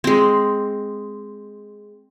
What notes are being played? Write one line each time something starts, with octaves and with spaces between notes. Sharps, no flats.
G#3 C4